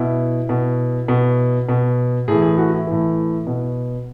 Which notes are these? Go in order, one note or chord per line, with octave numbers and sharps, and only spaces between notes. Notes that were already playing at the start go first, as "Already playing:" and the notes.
Already playing: B2 E4
B2
B2
B2
A2 E3 G#4
G#4
F#4
E4
A2 E3
B2